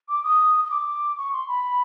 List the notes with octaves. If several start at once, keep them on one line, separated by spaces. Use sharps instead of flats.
D6
D#6
D#6
D6
C#6
C6
B5